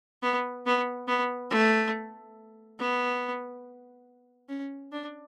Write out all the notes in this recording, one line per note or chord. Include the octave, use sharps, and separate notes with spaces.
B3
B3
B3
A3
B3
C#4
D4